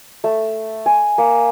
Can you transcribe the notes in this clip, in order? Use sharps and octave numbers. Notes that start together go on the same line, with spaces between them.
A3
G#5
A#3